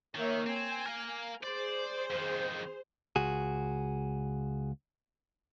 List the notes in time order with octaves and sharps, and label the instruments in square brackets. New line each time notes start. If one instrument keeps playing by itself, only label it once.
[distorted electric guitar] D#3 [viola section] A#3 C#5 E5
[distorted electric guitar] C4 [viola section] G#5
[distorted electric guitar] A#4 F5
[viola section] G#4 C5 [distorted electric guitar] D5
[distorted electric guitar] F2 D#3
[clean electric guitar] C#2 F#4 G#4